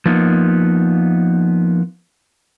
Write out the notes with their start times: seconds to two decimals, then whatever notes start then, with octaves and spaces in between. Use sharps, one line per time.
0.06 F3 A#3 B3 D#4